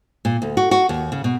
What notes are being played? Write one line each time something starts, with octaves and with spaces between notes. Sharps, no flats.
A#2
D2
F#4
F#4
D#2
C#3
B2